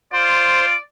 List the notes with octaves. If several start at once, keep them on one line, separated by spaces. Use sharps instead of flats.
F4 C5 D5